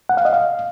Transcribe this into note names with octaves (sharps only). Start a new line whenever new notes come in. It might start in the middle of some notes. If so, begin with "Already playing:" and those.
F#5
F5
D#5
F5